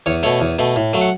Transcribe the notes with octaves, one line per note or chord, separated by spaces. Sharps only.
E2 C#5
B2 A3 C#5
E2
B2 A3
A2
F#3 A3
F#5